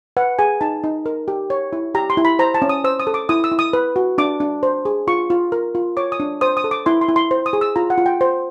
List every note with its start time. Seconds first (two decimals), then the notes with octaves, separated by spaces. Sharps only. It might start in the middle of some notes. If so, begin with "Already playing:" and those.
0.17 B4 F#5
0.39 G#4 G#5
0.61 D#4 A5
0.84 D#4
1.06 A#4
1.28 G4
1.50 C#5
1.73 E4
1.95 G4 A#5
2.10 C6
2.17 E4
2.25 B5
2.39 C5 A#5
2.54 A5
2.62 C#4
2.69 D#6
2.84 C5 E6
3.00 D#6
3.07 A4
3.14 D6
3.29 E4 D#6
3.44 E6
3.52 E4
3.59 D#6
3.73 B4
3.96 F#4
4.18 D4 D6
4.40 D4
4.63 C5
4.85 G#4
5.08 F4 C#6
5.30 F4
5.52 A#4
5.75 F4
5.97 C#5 D6
6.12 D#6
6.20 D4
6.41 C5 D#6
6.57 D#6
6.64 A4
6.71 D6
6.86 E4 C6
7.01 C6
7.08 E4
7.16 C6
7.31 C5
7.46 D#6
7.53 G#4
7.61 E6
7.76 F4 A#5
7.90 F#5
7.98 F4
8.06 G5
8.21 C5